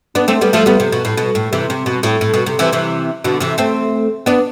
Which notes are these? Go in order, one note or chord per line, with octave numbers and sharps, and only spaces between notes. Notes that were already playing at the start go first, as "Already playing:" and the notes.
B3 D4
A3 C4
G3 B3
F3 A3
G3 B3
C3
B2
A2
B2
A2
C3 E3
C3
B2
A2
A2
B2
C3
C3 E3
C3 E3
B2 D3
C3 E3
A3 C4
B3 D4